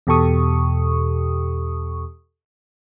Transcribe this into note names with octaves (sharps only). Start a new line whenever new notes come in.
E2 B2 G4 A4 C#6 D#6